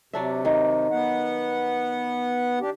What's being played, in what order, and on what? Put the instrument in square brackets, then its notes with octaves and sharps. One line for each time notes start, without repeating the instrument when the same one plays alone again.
[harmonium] C3 [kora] F#3 D4 E5
[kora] D#3
[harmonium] B3 F#5
D4 G4